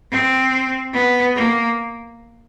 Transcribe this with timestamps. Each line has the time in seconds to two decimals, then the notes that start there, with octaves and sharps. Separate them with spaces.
0.11 C4
0.93 B3
1.35 A#3